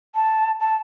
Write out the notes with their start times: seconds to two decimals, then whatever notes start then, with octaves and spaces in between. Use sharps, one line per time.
0.14 A5
0.59 A5